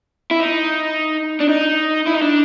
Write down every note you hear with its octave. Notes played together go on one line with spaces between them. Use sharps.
E4
D#4
D4
D#4
E4
D#4
D4